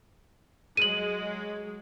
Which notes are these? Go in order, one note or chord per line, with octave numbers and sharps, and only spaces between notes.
F#3 G#3 D#7 F#7